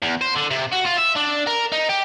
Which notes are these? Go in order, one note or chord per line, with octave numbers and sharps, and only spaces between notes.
E2
C5
D3
C3
F#4
F4
E5
D4
A#4
D#4
G4